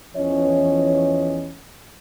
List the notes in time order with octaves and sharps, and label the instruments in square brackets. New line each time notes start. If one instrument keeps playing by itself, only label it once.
[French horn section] E2 E3 F3 C#4 C#5 D#5